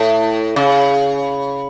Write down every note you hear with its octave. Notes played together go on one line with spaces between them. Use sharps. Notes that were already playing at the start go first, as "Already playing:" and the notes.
Already playing: A2
C#3